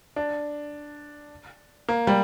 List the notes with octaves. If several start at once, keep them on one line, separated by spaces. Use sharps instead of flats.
D4
A#3
G3